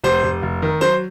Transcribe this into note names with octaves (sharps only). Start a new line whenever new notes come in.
F1 C5
F1
F1
D#3
F#3 C5